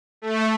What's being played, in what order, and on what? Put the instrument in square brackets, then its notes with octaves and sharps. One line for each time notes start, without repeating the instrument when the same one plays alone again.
[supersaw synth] A3